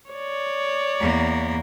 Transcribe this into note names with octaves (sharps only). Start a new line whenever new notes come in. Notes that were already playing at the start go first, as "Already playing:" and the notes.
C#5 D5
E2 A#3